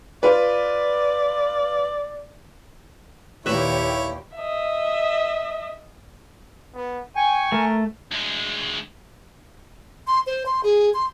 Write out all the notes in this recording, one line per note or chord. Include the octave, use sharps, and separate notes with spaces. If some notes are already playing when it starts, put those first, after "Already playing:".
F4 B4 D5
D#2 A#2 E4 G4 B4 C#5 E5
D#5 E5
B3
G5 G#5 C#6
A3 A#4
D2 G#3
C6
C5
C6
G#4
C6